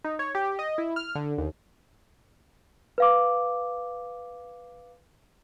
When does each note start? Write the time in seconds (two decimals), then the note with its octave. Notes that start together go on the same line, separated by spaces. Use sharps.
0.04 D#4
0.19 C#5
0.35 G4
0.59 D#5
0.78 E4
0.96 F6
1.15 D3
1.38 D#2
2.98 B4 F5 D6